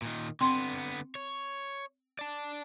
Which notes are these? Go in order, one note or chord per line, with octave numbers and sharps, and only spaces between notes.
A#2 D#3
D3 B3 C4 C6
C#5
D5 A5